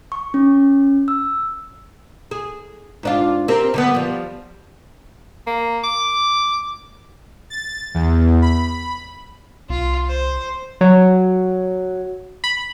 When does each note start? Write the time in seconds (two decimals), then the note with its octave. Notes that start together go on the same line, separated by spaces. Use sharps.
0.12 C#6
0.34 C#4
1.08 E6
2.31 G#4
3.03 G#2 D4 F4
3.48 C4 G4 A#4
3.74 D3 G3 B3
3.95 F3 G3
5.47 A#3
5.84 D6
7.50 A6
7.94 E2
8.42 B5
9.69 C2 F4
10.08 C5
10.81 F#3
12.44 B5